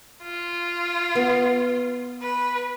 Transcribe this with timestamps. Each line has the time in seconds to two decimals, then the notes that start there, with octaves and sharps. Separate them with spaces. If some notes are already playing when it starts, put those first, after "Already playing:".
0.23 F4
1.15 B3
2.22 B4